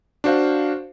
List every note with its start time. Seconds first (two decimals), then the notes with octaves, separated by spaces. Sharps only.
0.24 D4 F#4 C5 F5